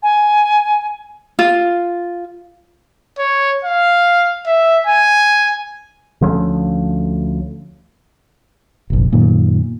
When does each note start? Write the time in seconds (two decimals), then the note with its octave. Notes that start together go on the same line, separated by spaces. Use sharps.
0.03 G#5
1.39 F4
3.19 C#5
3.65 F5
4.47 E5
4.87 G#5
6.21 D2 F3 A3 C#4
8.90 F1 A#1
9.12 F#2 A#2 D#3